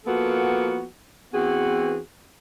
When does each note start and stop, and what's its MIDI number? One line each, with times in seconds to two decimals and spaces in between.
0.05 0.83 53
0.05 0.83 58
0.05 0.83 59
0.05 0.83 66
0.05 0.83 69
1.32 1.98 52
1.32 1.98 59
1.32 1.98 60
1.32 1.98 66
1.32 1.98 68